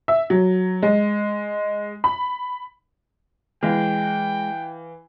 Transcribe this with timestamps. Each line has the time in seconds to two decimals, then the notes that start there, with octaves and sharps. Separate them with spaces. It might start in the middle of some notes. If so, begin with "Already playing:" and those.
0.08 E5
0.30 F#3
0.82 G#3
2.04 B5
3.63 E3 G#3 F5 G5